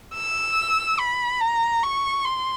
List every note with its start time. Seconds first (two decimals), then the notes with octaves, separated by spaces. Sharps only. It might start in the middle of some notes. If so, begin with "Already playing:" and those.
0.15 E6
0.99 B5
1.41 A#5
1.83 C#6
2.25 C6